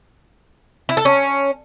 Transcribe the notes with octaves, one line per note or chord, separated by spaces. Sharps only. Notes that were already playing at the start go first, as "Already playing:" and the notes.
E4
A4
C#4